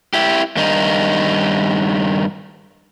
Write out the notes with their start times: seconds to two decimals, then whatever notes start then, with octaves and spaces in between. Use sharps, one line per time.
0.14 E4 G4
0.57 G2 D#3 D#4